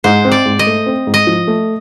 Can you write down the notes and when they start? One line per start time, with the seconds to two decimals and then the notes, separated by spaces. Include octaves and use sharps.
0.04 G#2 C5
0.25 C4
0.31 D5
0.45 G#2
0.59 D#5
0.66 A3
0.86 C4
1.07 G#2
1.14 D#5
1.27 F3
1.47 A3